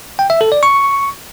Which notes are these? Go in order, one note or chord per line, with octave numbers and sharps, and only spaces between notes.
G5
E5
A4
D5
C#6